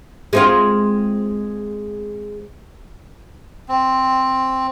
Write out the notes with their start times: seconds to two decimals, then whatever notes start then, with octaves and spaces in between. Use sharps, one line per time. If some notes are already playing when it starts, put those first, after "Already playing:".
0.33 G#3 C4 F4
3.69 C4